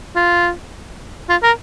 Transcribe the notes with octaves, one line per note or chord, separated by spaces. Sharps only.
F4
F4
A#4